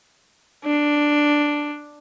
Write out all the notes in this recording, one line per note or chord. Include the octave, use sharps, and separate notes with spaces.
D4